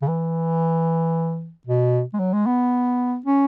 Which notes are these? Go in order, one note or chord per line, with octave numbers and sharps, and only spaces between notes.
C#3
E3
B2
G#3
F#3
G#3
B3
C#4